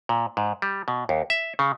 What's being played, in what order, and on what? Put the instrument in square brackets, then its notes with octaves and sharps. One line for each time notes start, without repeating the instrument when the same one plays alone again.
[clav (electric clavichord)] A#2
G#2
G3
B2
D#2
E5
C#3